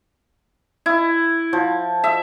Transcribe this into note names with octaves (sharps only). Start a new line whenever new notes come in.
E4
F3
E5